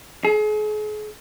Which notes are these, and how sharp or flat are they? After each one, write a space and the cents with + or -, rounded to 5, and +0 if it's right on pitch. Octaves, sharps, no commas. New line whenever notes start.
G#4 +40